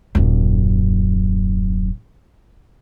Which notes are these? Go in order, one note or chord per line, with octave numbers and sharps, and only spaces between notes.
D#1 F#2